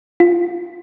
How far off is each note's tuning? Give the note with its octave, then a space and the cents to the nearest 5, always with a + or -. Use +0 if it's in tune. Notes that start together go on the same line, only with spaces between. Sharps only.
F4 -5